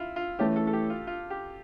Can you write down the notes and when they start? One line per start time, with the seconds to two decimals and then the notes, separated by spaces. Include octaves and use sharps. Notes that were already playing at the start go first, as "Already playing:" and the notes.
Already playing: E4 F4
0.16 F4
0.39 E3 A3 C#4 E4 G4
0.56 A4
0.67 A4
0.73 G4
0.90 F4
1.07 F4
1.30 G4